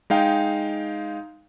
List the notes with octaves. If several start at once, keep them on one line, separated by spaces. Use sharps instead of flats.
G#3 D#4 F5 G5